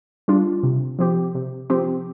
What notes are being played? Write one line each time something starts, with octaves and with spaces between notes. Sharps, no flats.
G3 D4 F4
C3
F3 C4 G4
C3
F3 C4 G4